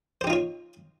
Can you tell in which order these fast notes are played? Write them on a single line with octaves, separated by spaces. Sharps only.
C5 G4 D#4 F4 C#5